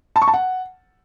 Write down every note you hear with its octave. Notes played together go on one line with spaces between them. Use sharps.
A5
C#6
A5
F#5